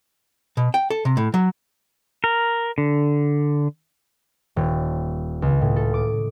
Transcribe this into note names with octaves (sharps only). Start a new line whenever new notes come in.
B2
G5
A4
C3
A2
F#3
A#4
D3
D#1
C#2
A2
A4
D6